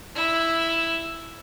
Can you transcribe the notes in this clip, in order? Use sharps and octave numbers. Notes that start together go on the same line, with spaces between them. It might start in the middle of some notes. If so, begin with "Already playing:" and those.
E4